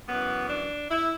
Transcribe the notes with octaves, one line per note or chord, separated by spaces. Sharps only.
F#2 E3 B3
D4
E4